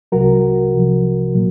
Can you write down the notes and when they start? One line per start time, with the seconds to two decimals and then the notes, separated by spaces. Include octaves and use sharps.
0.12 C2 C3 F#3 F#4 A#4
0.74 C2 C3 F3
1.35 A#2 F#3